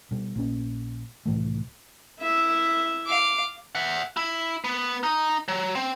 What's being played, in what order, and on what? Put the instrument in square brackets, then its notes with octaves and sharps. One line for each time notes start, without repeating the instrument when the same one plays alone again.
[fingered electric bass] B2 G3
A#1 A#3 C#4
C2 A2 E3 A3
[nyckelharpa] E4 E5
[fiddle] F5 D6
[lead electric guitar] E5 F#5
E4
B3
D#4
F#3
C4